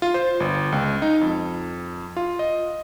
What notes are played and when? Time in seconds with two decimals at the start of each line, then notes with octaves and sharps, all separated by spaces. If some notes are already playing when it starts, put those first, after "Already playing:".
0.02 F4
0.14 C5
0.40 G1
0.72 C#2
1.02 D#4
1.21 F2
2.17 F4
2.39 D#5